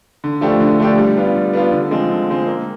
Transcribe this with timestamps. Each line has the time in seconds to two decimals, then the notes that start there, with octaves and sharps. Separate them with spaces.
0.24 D3
0.41 F3 A3 D4 G4
0.60 D3
0.80 F3 A3 D4 G4
0.98 G3
1.16 B3 D4 F4
1.36 G3
1.53 B3 D4 F4
1.72 D3
1.91 F3 G#3 C4
2.10 D3
2.28 F3 G#3 C4
2.47 A#3